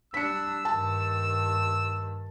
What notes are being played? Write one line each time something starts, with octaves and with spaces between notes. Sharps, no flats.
G3 D4 E6 B6 C#7
G2 D#3 A5